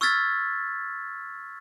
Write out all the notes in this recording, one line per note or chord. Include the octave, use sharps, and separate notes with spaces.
C#6 E6 F6 G#6 A6 B6